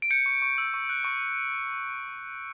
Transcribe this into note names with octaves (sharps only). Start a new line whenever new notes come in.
D7
G6 C#7
C#6
C#6
E6
C#6
F#6
C#6